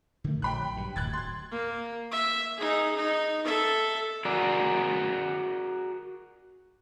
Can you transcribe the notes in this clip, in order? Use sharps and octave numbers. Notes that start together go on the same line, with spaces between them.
D3 D#3 A3
A#1 F#3 G5 B5 F#6
G2
D1 F#6 G#6 A6
C6 A6
A#3
E5
D#4 G#4
D#4
A4 E5
F#4 G#4 A#4 D5